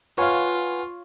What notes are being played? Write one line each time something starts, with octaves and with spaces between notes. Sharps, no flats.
F4 B4 C#5 F5 F#5 G#5